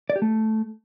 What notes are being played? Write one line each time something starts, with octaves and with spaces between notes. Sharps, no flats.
D5
G4
A3